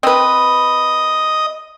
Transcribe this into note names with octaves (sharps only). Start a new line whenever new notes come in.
C4 B4 D#5